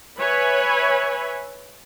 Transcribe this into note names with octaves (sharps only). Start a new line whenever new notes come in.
B4 C#5 E5 G#5 B5